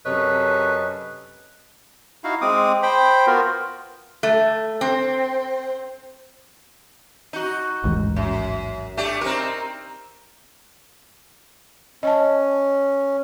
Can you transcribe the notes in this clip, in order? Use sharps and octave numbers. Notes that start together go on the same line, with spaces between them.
F#2 C3 A4 B4 C#5 D#5
D#4 E4 F#4 F5
G#3 C4 D6 D#6
C5 G5 B5
B3 F4 F#4 A#4
A3
C4
D#4 F#4
A1 D#2 G#2
F#2
A3 D4 G4
C4 D#4 A#4
C#4 D#5 A5